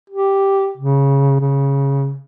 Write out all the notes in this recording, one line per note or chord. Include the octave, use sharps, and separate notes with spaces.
G4
C#3
C#3